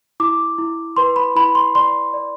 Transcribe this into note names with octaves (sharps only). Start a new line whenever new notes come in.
E4 D6
E4
B4 C6
B5
E4 B5
C6
D5 C6
D5